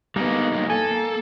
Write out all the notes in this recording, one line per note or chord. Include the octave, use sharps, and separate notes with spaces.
G3 G#3 A#3 B3 D#4
F#2 A#2
A4 G#5
A#3